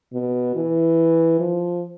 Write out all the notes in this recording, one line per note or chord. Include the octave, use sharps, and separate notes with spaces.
B2
E3
F3